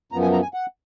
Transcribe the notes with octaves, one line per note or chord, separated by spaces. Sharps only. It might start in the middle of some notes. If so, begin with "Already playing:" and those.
F#2 F3 B3 A#5
G#5
A#5
G#5
F#5